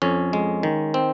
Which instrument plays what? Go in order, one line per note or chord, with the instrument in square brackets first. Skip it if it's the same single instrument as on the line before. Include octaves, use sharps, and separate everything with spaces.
[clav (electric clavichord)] F2 C#4
G#3
D#3
C4